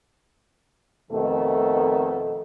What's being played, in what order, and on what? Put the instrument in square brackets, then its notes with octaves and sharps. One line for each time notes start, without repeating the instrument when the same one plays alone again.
[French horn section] F2 B2 D#3 A3 A4